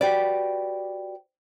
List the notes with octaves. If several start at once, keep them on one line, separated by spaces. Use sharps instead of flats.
F#4 G4 B4 D5